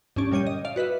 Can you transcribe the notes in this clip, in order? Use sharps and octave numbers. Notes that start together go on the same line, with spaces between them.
G2 D3 C#4 D5
A#2 G3 C#5 G6 D#7
D#5
D5 F5
F#4 B4 D#5 E5